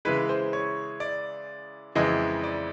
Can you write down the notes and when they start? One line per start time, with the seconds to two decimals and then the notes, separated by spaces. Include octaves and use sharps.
0.05 C#3 E3 G#3 B4
0.29 C5
0.53 C#5
1.00 D5
1.95 F2 C#3 E3 G#3 D#5
2.44 D5